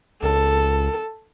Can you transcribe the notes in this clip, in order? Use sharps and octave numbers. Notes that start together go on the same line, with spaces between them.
C#2 A4